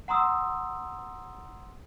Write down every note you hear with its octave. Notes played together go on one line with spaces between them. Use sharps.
F#5 A#5 C6 D#6 E6